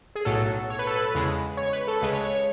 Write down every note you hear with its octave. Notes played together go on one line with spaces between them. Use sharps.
G#4
B1 A2 F#3 A4
C#5
B4
A4
B4
E2 C#3 G#3
C#5
B4
A4
C#2 C#3 G#3 B4
C#5
C#5
C#5